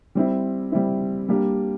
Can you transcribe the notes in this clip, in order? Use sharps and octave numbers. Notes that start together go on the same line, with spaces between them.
G3 C4 E4
G3 C4 E4
G3 A#3 D4 G4